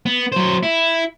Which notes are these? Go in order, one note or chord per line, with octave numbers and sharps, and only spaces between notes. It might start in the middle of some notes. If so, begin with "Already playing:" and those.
B3
F#3 C5
E4